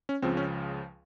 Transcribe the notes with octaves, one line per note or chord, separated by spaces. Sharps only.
C#4
C#2 C#3 F3 C4
C#4